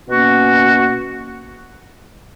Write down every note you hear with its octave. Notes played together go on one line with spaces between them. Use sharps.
B2 A#3 C#4 F#4